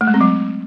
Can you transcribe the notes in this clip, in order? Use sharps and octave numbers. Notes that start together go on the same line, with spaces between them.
A3
G#3
C4
F#3